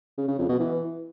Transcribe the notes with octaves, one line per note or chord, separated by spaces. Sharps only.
C#3
C#3
F2
B2
E3